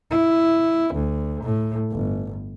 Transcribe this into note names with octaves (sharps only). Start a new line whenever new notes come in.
E4
D2
A2
G1